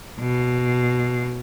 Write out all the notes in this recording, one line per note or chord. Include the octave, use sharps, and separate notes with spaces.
B2